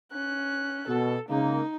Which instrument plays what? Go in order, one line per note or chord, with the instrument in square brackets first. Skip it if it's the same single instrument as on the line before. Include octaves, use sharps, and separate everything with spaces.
[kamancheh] C#4 F#6
[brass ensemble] B2 [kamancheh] A4
[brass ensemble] C#3 G#3 A#3 [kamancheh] D#4